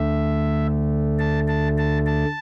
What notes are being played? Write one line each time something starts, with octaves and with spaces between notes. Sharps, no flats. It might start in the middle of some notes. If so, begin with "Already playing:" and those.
Already playing: D2 D3 A3 E5
A5
A5
A5
A5